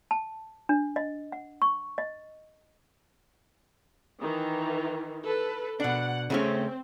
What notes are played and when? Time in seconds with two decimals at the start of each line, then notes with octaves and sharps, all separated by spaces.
0.11 A5
0.69 D4
0.96 D#5
1.32 F#5
1.62 C#6
1.98 D#5
4.19 D#3 E3
5.25 A4 B4
5.80 B2 D4 F#5
6.30 C#3 A3 C4 C#4